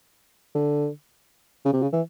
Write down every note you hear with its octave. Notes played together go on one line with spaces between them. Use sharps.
D3
C#3
C3
C#3
E3